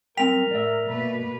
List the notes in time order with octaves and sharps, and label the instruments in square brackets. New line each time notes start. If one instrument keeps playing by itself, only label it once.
[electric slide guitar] F#2 C4 G5 [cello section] G3 [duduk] A#4 [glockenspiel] B6 F7
[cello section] A2 [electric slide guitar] D5 E5
[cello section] B2 A#3 B4